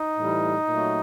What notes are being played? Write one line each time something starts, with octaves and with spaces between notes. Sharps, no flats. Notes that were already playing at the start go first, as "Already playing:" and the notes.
Already playing: D#4
A2 E3 G3
A#2 F#3 A3